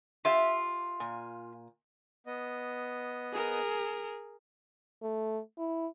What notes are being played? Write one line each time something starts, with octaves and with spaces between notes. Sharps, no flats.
F4 G4 E5
A#2 G#5
B3 D#5
G#4 A#4
A3
E4